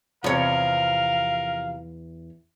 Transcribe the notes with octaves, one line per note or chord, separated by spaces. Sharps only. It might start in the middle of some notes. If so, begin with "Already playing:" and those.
E2 C3 F3 A#4 C#5 F5